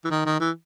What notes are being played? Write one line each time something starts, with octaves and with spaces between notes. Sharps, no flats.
E3
D#3
D#3
E3